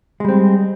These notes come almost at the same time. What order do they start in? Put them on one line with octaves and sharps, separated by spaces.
G#3 G3 C4